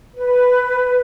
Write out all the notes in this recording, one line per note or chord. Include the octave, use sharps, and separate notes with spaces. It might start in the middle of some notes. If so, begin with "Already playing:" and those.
B4